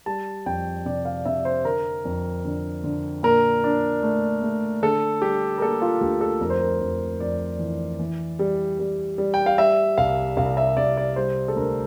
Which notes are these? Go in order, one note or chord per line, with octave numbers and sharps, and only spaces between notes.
G3 A5
F2 G5
C3 D5
F5
C3 E5
C5
D3 A#4
F2
D3
D3
A#2 A#4
D4
A3
A3
D3 A4
G3 G4
A#4
A#3 A4
F4
D2 G4
A4
F2 A#4
C5
A#4
F2
F2 D5
E3
E3
G3
G3
G3
G5
F5
G3 E5
C2 F5
C2 F5
E5
C2 D5
D5
G3 C5
A4
D2 A#4